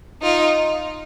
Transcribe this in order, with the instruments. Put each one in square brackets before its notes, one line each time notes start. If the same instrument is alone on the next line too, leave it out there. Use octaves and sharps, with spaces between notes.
[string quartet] D#4 F4